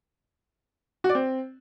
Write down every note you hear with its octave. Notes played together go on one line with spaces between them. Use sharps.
F#4
D5
C4